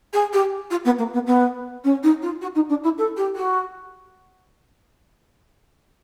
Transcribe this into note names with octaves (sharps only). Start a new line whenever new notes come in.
G#4
G4
F4
B3
A#3
B3
B3
C#4
D#4
F4
F#4
D#4
D4
E4
A4
G4
F#4